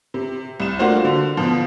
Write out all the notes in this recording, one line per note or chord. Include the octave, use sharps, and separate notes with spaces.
C3
C2 E7
A3 A#3 D4 F4 F#4 C5
D3
B2 F3